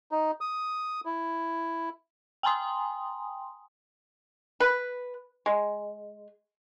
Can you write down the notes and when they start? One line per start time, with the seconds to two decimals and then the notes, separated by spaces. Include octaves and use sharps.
0.11 D#4
0.41 D#6
1.05 E4
2.43 G5 G#5 A#5 C6 D#6
4.60 B4
5.46 G#3